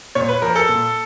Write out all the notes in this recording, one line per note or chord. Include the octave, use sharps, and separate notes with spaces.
A#2 C#5
B4
F3 A#4
A4
A#2